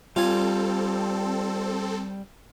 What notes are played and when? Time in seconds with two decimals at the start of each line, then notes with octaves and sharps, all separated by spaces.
0.16 G3 C4 F4 A4 G#5